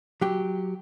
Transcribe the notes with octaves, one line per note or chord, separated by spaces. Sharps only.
F#3 G4